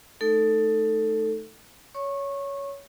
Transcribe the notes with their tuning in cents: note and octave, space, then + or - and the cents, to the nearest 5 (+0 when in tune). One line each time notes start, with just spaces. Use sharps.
A3 -15 D#4 +0 A4 +15
C#5 +15 C#6 -20